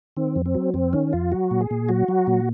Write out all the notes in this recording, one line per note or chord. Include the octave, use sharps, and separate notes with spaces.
D#3 C4
F2
C4
F#3
F2 C4
D#3 C#4
F2 F4
F#3 F#4
A#2
G#4
A#2
F#3 F#4
F#3
A#2